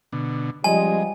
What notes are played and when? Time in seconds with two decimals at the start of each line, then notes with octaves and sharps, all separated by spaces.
0.12 B2 D3
0.64 F3 G3 G#3 C#4 C5 D#5 G#5